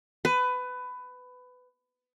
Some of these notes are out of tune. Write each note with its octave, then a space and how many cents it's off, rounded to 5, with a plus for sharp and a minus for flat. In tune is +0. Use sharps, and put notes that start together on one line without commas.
B4 +20